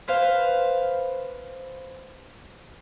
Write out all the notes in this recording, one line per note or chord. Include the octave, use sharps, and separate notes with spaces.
B4 C5 F5